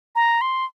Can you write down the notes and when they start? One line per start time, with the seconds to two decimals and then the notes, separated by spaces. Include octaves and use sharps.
0.16 A#5
0.41 C6